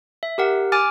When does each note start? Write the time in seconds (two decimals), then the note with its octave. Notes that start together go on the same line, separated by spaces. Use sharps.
0.23 E5
0.38 G4 A#4 F#5
0.72 G#5 D6 F6 A6